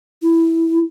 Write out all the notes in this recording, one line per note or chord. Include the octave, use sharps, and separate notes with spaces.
E4